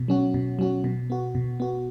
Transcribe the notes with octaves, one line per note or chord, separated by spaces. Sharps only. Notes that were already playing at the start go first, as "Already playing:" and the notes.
Already playing: B2
F#3 C#4 F#4
B2
F#3 C#4 F#4
B2
B3 F#4
B2
B3 F#4